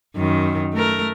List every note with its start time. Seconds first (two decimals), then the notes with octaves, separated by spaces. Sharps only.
0.16 F#2 D#3
0.73 A3 A#4